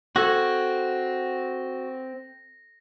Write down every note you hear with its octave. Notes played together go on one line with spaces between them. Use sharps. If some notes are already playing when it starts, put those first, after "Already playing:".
C4 F#4 A4 G#6 A#6